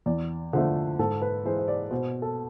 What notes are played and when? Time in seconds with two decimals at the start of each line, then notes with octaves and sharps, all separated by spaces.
0.06 E2 D5
0.53 D3 F3 A3 C5
0.99 G#2 A4
1.22 B4
1.45 E3 G#3 C5
1.59 C5
1.68 D5
1.91 B2 C5
2.22 A4